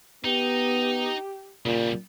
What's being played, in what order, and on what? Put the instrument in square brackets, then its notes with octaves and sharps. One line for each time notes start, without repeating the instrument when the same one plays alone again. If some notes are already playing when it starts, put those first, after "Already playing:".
[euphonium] B3 [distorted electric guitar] D#4 [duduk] G4
[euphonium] A#2 [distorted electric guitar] C#3 G3